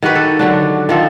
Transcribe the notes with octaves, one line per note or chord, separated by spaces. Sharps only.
D#3 F#4 G4 B4
A4
D3 F#3 D4
D#3 F3 A4